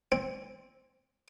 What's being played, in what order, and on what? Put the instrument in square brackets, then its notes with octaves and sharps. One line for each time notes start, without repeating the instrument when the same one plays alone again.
[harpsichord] C4